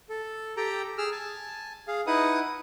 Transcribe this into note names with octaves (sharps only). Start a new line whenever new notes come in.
A4
G4 A4 G5 A#5
G#4 E6 F6
G#5 A5
G#4 F5
D#4 E4 B4 F#5 D#6